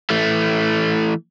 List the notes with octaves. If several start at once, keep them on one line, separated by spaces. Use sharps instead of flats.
E3 A3